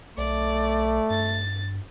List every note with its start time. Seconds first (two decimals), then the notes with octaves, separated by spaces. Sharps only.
0.18 B1 A3 D5
1.10 G2 A6